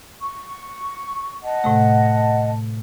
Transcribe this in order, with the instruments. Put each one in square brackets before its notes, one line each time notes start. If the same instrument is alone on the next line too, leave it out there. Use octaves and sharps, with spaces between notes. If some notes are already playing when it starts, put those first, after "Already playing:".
[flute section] C#6
D#5 F#5 A5
[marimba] A2 C3 A3